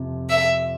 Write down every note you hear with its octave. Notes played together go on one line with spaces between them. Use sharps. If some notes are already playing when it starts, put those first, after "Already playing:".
Already playing: F2 C3 F3
E5